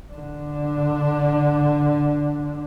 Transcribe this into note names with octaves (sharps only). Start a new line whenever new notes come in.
D3 D4